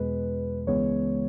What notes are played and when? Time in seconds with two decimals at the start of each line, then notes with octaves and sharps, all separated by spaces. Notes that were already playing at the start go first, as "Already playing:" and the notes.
Already playing: E2 B2 G#3 B4
0.67 C#2 C#3 E3 G#3 B3 C#5